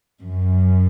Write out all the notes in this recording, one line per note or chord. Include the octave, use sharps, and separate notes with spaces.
F#2